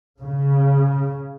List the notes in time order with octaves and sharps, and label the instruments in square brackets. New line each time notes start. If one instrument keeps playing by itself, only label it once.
[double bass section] C#3